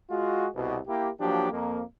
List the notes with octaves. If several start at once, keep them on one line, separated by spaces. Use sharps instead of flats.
G#3 F4 F#4
C2 B2
A#3 E4 G4
F3 F#3 A#3 D4 G4
F2 A#3